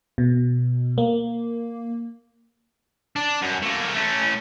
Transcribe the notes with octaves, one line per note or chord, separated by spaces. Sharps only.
B2
A#3
D4
F#2
A3 A#3
A3 C#4